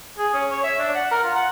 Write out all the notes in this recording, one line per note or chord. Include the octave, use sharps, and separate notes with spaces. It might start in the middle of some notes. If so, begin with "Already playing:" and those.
G#4
C#4
C#5
E5
D4
F#5
A#4
F4
F#5